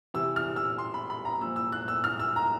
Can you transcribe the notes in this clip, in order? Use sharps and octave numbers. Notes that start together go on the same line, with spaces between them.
C3 E3 E6
F6
E6
C6
B5
B5
A#5
A#2 F3 E6
E6
F#6
E6
F6
E6
A#5